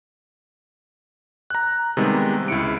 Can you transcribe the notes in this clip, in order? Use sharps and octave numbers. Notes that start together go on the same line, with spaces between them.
A#5 F#6
C3 D#3 G3 G#3 B3
C#2 E4 C#7 D7